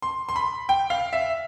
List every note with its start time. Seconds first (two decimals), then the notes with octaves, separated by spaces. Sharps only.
0.02 C6
0.29 C6
0.36 B5
0.69 G5
0.90 F5
1.13 E5